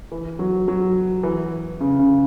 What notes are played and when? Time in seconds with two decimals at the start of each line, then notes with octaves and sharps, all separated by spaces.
0.12 E3
0.39 F#3
0.68 F#3
1.23 E3
1.81 C#3
1.99 C#3